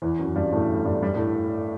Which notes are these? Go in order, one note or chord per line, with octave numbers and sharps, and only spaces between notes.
E2 E3
F#2 F#3
G2 G3
A2 A3
G2 G3
G2 G3
A2 A3